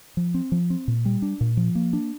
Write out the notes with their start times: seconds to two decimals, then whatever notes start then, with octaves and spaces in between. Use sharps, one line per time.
0.17 F3
0.34 C4
0.52 F3
0.70 C4
0.88 A#2
1.05 G3
1.22 D4
1.41 A#2
1.57 F3
1.75 A#3
1.93 D4